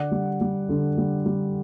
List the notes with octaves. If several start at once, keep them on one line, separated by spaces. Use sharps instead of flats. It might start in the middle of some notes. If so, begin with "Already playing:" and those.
Already playing: D3 D5 F#5
G3
G3
D3
G3
G3